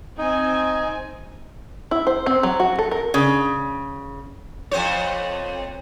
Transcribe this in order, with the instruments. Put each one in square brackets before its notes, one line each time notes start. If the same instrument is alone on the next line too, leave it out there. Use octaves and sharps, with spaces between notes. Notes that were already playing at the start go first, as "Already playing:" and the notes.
[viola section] C4 G#5 [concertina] D#4
[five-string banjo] E4
C5
C4
F#3
F#4
A4
A#4
[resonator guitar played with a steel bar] C#3
[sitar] F2 C5 C#5